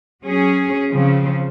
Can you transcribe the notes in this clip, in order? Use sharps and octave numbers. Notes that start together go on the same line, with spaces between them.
F#3 C#4 G#4
C#3 F3 C4